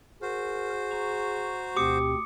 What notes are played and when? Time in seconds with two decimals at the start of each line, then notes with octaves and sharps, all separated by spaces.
0.22 F#4 G#4 A#4 C5
0.91 A#5 C#6
1.77 D2 B2 C4 G4 D6 D#6 C#7